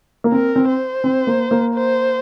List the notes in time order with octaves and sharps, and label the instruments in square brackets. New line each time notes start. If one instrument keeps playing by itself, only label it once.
[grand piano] A#3
[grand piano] C4 [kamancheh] A#4
[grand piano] C4
[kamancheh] C5
[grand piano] C4
A#3
A#3
[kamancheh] C5